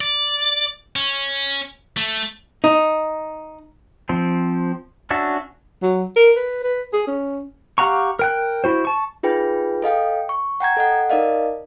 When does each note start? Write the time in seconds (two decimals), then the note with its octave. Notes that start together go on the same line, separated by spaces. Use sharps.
0.01 D5
0.96 C#4
1.97 A3
2.64 D#4
4.09 F3 C4
5.10 C#4 D4 F#4 E5
5.82 F#3
6.16 A#4
6.36 B4
6.63 B4
6.93 G#4
7.07 C#4
7.78 G4 F5 F#5 A#5 C#6
8.19 A#4 G5 F#6
8.64 E4 F#4 C5
8.85 A5 C#6
9.23 D#4 F4 G#4 B4 G5
9.82 A4 D#5 F5 G5
10.29 C#6
10.60 F#5 G5 A#5 G#6
10.77 A4 D#5 F#5
11.10 D#4 A#4 D5 D#5 F5